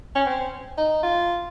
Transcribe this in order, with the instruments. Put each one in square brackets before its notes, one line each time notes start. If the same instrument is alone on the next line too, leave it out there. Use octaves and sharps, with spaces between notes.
[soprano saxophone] C#4
C4
D#4
F4